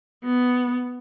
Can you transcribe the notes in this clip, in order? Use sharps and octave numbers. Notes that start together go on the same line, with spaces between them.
B3